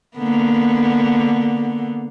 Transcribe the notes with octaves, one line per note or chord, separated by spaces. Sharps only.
D3 A#3 B3